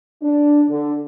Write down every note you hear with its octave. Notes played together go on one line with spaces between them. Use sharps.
D4
D3